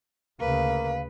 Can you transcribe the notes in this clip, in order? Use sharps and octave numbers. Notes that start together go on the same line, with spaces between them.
D2 C#3 A#3 B4 F5